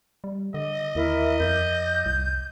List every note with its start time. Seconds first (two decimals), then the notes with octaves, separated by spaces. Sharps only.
0.24 G3
0.54 D3 D#5
0.95 D#2 E4 A#4 E5
1.40 F2 G6
2.06 C2